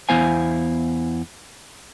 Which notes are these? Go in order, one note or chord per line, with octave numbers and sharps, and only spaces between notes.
E2 B3 E4 C5 F5 G#5